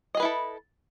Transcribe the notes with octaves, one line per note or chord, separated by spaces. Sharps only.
E4 G#4 A4 B4 D#5